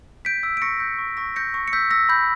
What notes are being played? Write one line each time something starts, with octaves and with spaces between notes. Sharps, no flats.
G6 B6 D7
E6
D7
C#6 A#6 C#7
G6
C#6
C#6 A#6
G6 A#6 C#7
C#6
C#7
E6 G6 B6
E6 A#6
B5 G6